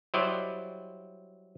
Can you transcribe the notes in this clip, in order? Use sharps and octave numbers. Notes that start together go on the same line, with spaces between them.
F#3 G3 E4 C5 D5 D#5